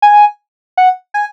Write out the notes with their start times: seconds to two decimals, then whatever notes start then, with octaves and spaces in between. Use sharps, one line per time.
0.02 G#5
0.77 F#5
1.14 G#5